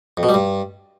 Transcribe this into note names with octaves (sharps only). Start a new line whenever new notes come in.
F2
B2
G3
G2